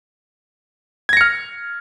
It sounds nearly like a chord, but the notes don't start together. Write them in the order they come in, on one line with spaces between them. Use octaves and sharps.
G#6 A#6 C#7 F6